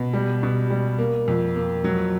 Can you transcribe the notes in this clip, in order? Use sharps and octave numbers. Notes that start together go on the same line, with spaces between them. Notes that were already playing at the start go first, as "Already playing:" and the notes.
Already playing: B2
G3
B2
G3
A#3
F2
A#3
F#3